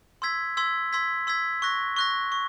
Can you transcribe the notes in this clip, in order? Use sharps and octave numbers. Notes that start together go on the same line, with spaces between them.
C6 E6 G#6 B6
C6 E6 G#6 B6
C6 E6 G#6 B6
C6 E6 G#6 B6
C#6 F#6 A#6
C#6 F#6 A#6
C#6